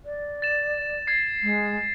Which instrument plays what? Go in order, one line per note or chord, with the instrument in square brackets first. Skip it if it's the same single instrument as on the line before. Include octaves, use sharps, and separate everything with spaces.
[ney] D5
[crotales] A6 E7
G#6 A6 C7
[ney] G#3